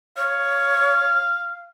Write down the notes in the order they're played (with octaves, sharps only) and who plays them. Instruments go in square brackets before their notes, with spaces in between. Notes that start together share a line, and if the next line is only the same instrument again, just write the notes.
[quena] C#5 [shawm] F5